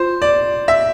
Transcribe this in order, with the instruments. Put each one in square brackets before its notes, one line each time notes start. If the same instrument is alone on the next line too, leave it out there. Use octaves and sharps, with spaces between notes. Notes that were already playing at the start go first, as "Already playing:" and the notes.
Already playing: [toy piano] F4 [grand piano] C5
[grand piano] D5
E5